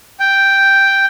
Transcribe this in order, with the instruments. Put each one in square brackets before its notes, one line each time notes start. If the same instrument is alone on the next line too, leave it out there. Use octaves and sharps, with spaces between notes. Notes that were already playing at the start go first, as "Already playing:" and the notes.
[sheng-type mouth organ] G5